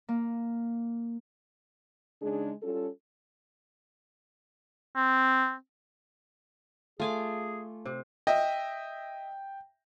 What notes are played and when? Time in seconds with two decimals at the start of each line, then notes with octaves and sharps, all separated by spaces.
0.09 A#3
2.21 C#3 G#3 D4 D#4 G#4
2.62 G3 C#4 F4 A4
4.96 C4
7.00 A3 F4 G#4 G#5 D6
7.85 C3
8.27 D#5 E5 G5